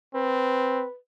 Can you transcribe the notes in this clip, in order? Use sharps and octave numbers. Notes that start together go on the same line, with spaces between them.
C4 B4